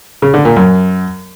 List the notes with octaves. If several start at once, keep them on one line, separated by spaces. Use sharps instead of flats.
C#3
D3
A#2
F#2